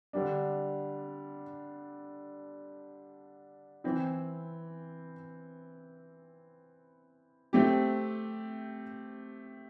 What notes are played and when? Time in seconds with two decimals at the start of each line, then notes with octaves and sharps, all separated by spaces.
0.13 D3 G3 D4
3.84 E3 C4 E4
7.53 A3 C4 G4